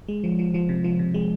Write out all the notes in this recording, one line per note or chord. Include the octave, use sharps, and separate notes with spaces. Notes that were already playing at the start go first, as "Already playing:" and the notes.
G#3
F3
F3
F3
C3
F3
C3
G#3